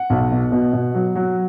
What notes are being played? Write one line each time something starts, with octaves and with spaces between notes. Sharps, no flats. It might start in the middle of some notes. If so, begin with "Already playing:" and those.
Already playing: F#5
B1
B2
B2
B2
F#3
F#3